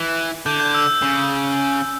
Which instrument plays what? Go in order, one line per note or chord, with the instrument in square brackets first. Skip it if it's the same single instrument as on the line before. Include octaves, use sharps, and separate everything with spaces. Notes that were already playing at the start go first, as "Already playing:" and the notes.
Already playing: [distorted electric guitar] E3
[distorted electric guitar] D3 [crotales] G6
[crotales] G6
E6
[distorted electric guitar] C#3